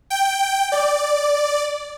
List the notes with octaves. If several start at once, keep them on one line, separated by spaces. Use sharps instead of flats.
G5
D5